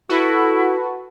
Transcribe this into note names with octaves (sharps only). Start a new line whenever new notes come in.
E4 F#4 A4 B4